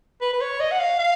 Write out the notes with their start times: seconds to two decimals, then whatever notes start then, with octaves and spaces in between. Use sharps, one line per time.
0.21 B4
0.33 B4
0.41 C#5
0.60 D#5
0.71 F#5
0.79 F5
0.99 F5